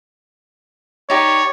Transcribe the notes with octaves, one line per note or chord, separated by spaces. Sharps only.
D#4 G4 C#5 D5